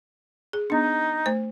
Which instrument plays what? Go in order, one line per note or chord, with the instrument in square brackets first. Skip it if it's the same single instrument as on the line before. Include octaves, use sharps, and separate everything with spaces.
[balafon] G#4
[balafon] B3 D4 [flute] D#4
[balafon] A3 C5